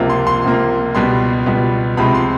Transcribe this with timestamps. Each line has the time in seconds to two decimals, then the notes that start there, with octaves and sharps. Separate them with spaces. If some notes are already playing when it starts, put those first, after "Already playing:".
Already playing: C#2 C3 F3 A#3
0.10 C6
0.27 C6
0.44 C#2 C3 F3 A#3
0.95 C#2 B2 G3 B3 C6
1.46 C#2 B2 G3 B3
1.97 C#2 C3 F3 G#3 C4 B5
2.15 C6